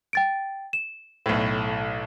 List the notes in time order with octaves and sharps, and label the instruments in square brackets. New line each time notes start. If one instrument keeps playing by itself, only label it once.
[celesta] G5 A6 D7
E7
[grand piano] B1 A2